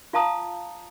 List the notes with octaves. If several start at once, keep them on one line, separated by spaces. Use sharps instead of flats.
F4 F5 A5 A#5 D#6